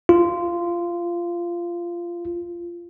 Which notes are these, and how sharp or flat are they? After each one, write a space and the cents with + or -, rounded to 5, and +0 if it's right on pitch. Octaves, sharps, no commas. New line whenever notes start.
F4 -15